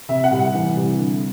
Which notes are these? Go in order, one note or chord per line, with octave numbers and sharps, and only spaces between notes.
C3 E5
F#5
C2
F#5
E3
C2
D3